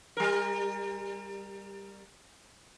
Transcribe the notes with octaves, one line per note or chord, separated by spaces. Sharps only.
G3 A#4